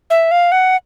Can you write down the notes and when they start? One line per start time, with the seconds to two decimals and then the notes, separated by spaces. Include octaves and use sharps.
0.10 E5
0.31 F5
0.52 F#5